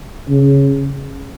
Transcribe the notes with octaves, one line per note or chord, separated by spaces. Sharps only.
C#3